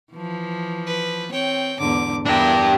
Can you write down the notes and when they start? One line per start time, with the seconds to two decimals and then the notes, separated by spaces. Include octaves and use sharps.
0.13 E3 F3
0.87 B4
1.32 C4 C#5 G5
1.80 E2 G#2 D3 D6
2.26 E2 D4 E4 G4 A#4